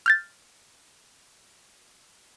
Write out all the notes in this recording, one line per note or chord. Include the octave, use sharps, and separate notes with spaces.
F6 G6 A6